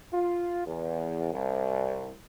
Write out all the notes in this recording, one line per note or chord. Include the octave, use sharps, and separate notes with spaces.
F4
E2
C2